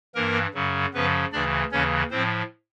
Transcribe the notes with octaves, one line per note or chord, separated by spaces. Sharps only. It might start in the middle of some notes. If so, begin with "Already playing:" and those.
G2 E3 A#3 A#4
F#2 C#3 F#3
F#2 C#3 F3 B3 B4
D2 C#3 E3 D4 D5
D#2 C#3 E3 C#4 C#5
A2 F3 C4 C5